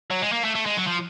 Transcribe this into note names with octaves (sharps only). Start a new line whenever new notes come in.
F#3
G#3
A#3
A3
A3
G#3
F#3
F3